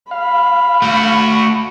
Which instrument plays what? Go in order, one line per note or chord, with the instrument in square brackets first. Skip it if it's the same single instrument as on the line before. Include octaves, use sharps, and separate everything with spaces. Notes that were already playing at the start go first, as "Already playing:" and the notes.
[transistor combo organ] F5 [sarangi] B5
[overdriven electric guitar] A3 F#4